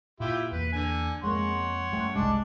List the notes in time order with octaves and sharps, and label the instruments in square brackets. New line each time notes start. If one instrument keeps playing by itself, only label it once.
[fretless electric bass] A#2 [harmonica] E4 F4 G4
[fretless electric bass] E2 A#3 [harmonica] B4
[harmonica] D3 G#5
[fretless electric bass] F2 [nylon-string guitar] G#3 A#3 [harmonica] C#5 F#5 C6
[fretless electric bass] F#2 [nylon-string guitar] G3 A3 G5
[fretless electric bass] F#1 C2 [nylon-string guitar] G3 G#3 D5 [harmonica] D4